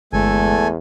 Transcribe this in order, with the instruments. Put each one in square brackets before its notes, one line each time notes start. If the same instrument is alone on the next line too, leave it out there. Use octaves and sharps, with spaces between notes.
[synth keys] G1 G#3 [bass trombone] E2 [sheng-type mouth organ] A3 A4 G#5